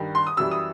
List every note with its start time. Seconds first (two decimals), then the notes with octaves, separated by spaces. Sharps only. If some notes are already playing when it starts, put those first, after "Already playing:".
Already playing: G2 D#3 G3
0.15 C6
0.27 D#6
0.37 F#2 E3 G3 E6
0.51 D#6